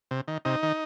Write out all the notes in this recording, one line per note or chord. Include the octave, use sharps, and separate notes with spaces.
C3
D#3
C3 D#4
D#3